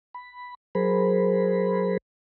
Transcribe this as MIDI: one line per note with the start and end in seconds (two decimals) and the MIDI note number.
0.14 0.55 83
0.75 1.97 54
0.75 1.97 68
0.75 1.97 70
0.75 1.97 72
0.75 1.97 83